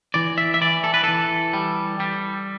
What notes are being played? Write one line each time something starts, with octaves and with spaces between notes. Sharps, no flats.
E3 D5
E5
E5
E3 D5
A4
B4
E3 A4
G3
G3